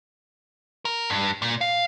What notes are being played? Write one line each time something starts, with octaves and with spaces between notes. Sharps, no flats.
A#4
G2
A#2
F5